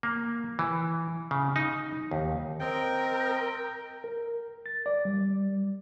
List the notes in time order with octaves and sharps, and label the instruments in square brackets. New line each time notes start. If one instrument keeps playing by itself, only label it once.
[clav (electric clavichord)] A#3
E3
C#3
D#4
D#2
[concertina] C4 D#5 [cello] A#4 [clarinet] G5
[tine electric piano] A#4
A6
D5
G3